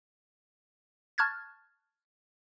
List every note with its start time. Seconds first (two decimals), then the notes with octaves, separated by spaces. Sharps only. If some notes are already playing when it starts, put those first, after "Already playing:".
1.18 A5 C#6 F6 F#6 G#6 A6